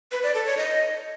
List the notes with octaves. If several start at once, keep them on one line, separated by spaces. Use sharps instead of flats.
B4
D5
A4
C#5
D#5